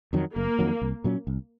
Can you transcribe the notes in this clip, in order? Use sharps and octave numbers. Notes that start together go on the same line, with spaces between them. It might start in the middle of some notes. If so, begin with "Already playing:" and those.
F2 D#3 F#3
F#1 A#3
F2 D#3 F#3
C2
A#2 F#3 C#4
C2